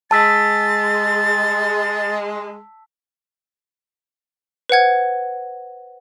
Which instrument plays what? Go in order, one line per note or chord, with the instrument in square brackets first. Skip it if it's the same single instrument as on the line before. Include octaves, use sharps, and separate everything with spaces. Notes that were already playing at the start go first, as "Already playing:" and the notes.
[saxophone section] G#3 [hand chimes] A5 E6 B6 [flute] A6
[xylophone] B4 C5 F#5 G#6